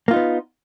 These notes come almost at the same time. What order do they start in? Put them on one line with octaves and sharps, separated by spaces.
A#3 F4 D#4 B3